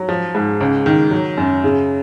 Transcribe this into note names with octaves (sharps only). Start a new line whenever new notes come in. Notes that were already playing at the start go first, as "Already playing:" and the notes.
Already playing: F#3
F3
G#2
C#2
D#3
F#3
F#2
C#3